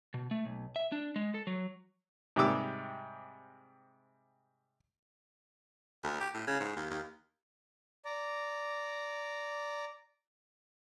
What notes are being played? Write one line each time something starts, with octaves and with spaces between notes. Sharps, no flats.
B2
A3
B1
E5
D4
G#3
A4
F#3
G#2 C3 G3 D6 E6
D2
G4
A2
C#3
G#2
D#2
D#2
D5 A#5